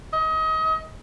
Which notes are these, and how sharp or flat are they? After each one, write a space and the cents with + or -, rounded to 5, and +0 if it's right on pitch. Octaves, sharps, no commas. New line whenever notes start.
D#5 +30